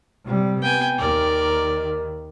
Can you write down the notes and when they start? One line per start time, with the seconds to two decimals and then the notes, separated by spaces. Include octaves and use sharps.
0.25 C3 G3
0.62 B3 G5 G#5
0.98 D#2 D#3 A#4 D5